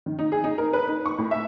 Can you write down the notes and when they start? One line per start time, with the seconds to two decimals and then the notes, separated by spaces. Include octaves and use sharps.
0.06 D#3
0.19 D#4
0.32 G#4
0.44 D#4
0.58 A#4
0.73 B4
0.87 D#4
1.06 C#6
1.18 A2
1.31 E5